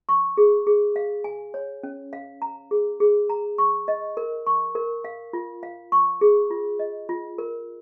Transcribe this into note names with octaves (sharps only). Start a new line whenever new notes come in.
C#6
G#4
G#4
F5
G#5
C#5
C#4
F5
A#5
G#4
G#4
A#5
C#6
D#5
A#4
C#6
A#4
F5
F4
F5
C#6
G#4
F4
D#5
F4
A#4